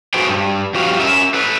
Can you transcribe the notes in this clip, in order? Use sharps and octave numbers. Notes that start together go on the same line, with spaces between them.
F#4 G#4 A4 B4 C5 G5
G2
G2 F3 F#4 G4 F5
C#4 A#4 E5
A4 B4